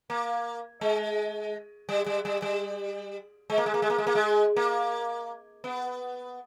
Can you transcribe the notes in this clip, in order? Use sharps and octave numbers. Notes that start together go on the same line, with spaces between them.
A#3
G#3
G3
G3
G3
G3
G#3
A#3
G#3
A#3
G#3
A#3
G#3
A#3
G#3
A#3
B3